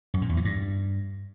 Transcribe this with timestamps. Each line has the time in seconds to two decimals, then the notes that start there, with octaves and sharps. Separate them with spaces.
0.14 F#2
0.21 A#2
0.29 E2
0.37 E3
0.45 G2